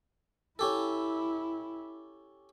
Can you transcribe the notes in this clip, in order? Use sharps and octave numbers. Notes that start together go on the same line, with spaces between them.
C#4 E4 G4 A4